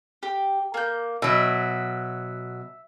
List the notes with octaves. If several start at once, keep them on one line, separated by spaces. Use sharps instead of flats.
G4
A#3 G6
B2 F#3 E5